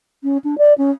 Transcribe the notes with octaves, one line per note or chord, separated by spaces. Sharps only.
C#4
D4
D5
C#4